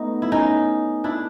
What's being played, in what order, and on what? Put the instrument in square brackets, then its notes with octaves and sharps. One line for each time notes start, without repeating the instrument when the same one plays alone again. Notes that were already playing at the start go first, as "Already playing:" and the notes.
Already playing: [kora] A3 B3 D#4
E4
C#4 D#4
D4 E4